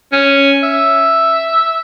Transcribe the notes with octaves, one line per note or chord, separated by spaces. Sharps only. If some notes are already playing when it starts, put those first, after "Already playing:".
C#4
E5